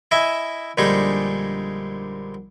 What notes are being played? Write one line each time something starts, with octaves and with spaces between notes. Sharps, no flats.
E4 D#5 E5 G#5
A#1 D3 G3 G#3 D#4 G#4